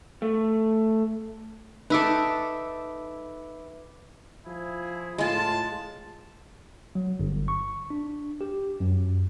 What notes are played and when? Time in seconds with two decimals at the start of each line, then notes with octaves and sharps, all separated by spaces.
0.22 A3
1.90 D#4 A4 B4 E5 D6
4.46 F3 E4 G#4
5.18 A2 G#3 F4 A5
6.95 F#3
7.19 G1
7.48 C#6
7.90 D4
8.41 G4
8.80 F#2